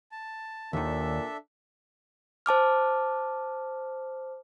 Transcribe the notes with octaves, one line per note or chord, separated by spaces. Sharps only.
A5
D#2 A#2 D#3 D4 A4 E5
C5 A5 D6 F6